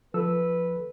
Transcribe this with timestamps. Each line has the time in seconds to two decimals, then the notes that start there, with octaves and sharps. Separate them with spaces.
0.14 F3 A4 B4 E6